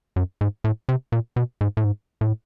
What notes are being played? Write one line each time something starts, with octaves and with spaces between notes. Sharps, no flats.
F#2
G#2
A2
C3
A#2
B2
G#2
A2
G#2
A2